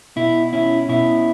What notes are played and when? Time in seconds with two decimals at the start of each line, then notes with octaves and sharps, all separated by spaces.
0.16 B2 E4
0.53 C#4 E4
0.89 B2 E4